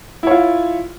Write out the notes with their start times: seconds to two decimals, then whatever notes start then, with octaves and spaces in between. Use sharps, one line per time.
0.23 E4
0.27 C#5
0.31 F4